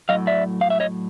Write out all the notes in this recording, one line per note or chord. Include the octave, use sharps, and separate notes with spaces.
A2 F#3 D#5 F5
D5 E5
F5
E5
C#5 D#5